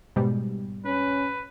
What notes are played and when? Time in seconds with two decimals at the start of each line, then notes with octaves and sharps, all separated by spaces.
0.16 G#2 B2 G3
0.85 C#4 B4